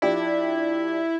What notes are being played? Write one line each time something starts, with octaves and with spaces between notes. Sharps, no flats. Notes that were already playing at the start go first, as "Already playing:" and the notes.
F3 D4 E4 G4